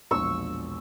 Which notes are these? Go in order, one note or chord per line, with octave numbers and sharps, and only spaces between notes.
E1 A#1 C#6 E6